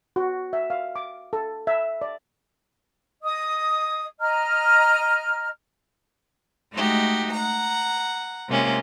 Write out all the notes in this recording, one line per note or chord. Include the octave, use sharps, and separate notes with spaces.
F#4
E5
F5
D6
A4
E5
D5
D#5 D#6
D#5 A#5 F6
G#3 A3 D#4 F#4 G4
F#5 A#5
C3 G#3 A#3 C#4 F4